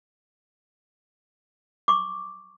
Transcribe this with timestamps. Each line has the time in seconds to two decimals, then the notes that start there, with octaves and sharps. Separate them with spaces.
1.88 C#6 D6